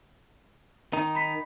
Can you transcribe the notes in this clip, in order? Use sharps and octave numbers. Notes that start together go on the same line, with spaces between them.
D#3 D#4
B5 B6